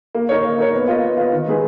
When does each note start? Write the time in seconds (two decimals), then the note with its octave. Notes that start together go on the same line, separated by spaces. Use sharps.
0.15 A#3
0.29 D#4 A#4 C#5
0.45 A#3
0.58 D#4 A#4 C#5
0.74 B3
0.88 F4 B4 D#5
1.02 B3
1.17 F4 B4 D#5
1.33 D#3
1.47 G#3 D#4 G#4 B4